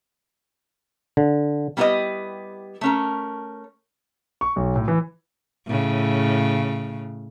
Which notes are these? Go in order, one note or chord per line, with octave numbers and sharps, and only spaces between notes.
D3
G3 B3 E4 G4 B4 D#5
A3 C#4 A#4
C#6
B1
A2
E3
A2 C#3